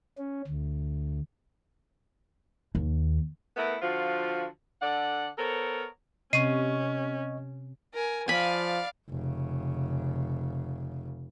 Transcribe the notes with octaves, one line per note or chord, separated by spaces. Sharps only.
C#4
D2
D#2
A3 B3 E4 A#4 B4
D3 F3 F4 F#4
D3 A4 D5 F#5
B3 A4 A#4 C5 C#5
C3 C#4 D#5 C#6 C7 D#7
A#4 G#5
F3 D5 F5 G#5 B5
F1 C#3